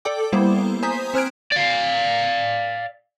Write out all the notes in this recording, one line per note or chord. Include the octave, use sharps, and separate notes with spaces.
A4 D5 G5 D6
G3 A#3 B3 E4 C5
C5 G#5 A#5 D#6 G6 B6
C4 C5 F6 F#6 G#6 D7
D5 F5